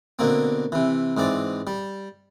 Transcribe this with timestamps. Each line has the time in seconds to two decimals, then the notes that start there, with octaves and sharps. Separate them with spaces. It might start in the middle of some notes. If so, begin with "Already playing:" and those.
0.19 B2 D3 A#3 C4
0.72 C3 E3
1.17 G#2 E3 C4 D5
1.67 G3